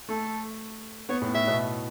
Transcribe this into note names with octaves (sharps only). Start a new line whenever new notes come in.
A3 A4
B3 C#5
A2
A2 E5
B2